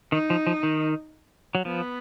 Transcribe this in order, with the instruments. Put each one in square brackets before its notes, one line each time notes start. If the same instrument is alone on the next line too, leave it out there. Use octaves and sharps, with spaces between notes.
[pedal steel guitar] D#3 [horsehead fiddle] D#4
[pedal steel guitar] F3
F3
D#3
F#3
[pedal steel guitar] F3 [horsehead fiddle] B3